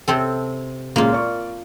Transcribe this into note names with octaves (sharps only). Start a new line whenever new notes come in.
C3 C4 A4
A#2 C#3 G#3 A#3 F4
D5 C#6